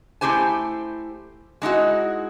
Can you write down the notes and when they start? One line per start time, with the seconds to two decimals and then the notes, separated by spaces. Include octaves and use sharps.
0.21 A3 C4 E4 G4 C5 G#5
1.62 G#3 D#4 E4 F#4